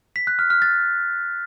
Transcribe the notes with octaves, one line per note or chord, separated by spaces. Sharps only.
B6
F#6
F6
F6
A6